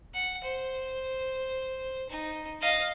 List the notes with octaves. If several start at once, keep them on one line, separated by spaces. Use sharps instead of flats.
F#5
C5
D#4
D#5 F5